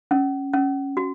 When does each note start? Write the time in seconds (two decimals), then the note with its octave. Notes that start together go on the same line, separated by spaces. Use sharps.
0.11 C#4
0.53 C#4
0.97 F#4